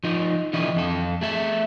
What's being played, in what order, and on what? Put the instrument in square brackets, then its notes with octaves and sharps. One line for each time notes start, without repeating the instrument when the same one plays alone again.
[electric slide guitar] F3 D#4
D3 E3 F3 E4 D#5
F2 A4
A3 G#4 E5